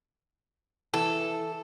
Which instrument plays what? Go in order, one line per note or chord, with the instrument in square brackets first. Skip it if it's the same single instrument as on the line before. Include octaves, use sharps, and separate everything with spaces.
[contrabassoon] E3 [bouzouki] A4